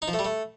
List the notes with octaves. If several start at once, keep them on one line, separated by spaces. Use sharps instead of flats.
D#4
F3
A3
G3
A3